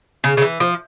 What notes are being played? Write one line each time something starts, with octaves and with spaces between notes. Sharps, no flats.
C#3
C#3
E3
F3